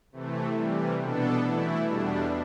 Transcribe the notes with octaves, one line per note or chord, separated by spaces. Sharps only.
C3 E3 A3
C3 E3 G3
B2 B3 D4 A4
E3 A3 E4
E2 B2 G3 D4